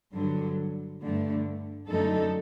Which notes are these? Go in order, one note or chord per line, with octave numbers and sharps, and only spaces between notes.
G2 D3 F#3
G2 D3 A3
F#2 D3 A3 D#4 A4